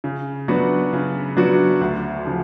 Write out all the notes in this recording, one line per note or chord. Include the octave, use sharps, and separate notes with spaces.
C#3
F#3 B3 D4 F#4
C#3
F#3 B3 D4 F#4
D2
C#3 F3